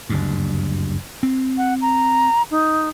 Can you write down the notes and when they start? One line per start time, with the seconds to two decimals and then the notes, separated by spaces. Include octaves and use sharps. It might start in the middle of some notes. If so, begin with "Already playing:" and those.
0.10 F#1 D2 G2
1.23 C4
1.58 F#5
1.81 A#5
2.51 D#4